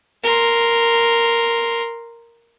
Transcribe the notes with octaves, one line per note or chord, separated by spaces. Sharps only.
A#4 C6